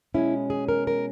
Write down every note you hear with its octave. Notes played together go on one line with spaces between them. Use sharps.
B2 G#3 C#4 E4
G#4
A#4
A#4